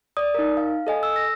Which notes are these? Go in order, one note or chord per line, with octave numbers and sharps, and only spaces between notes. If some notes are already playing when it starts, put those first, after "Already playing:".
D5 D#6
D#4 A#4
F5
A4 D#5 G#5
E6
A#6